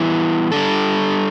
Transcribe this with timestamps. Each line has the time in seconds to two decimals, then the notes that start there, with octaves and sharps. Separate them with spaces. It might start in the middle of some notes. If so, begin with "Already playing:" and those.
Already playing: E3 G3 B3 E4
0.52 G3 D4 A4